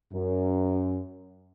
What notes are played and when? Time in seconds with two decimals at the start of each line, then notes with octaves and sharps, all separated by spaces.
0.12 F#2